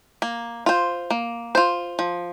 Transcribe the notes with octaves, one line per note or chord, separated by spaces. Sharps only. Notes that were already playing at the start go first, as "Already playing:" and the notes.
A#3
F4 C5
A#3
F4 C5
F3